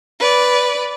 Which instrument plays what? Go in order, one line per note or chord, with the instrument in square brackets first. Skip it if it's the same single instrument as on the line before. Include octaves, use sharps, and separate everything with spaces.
[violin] B4 D5